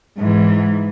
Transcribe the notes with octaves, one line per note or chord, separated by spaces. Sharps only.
G#2 E3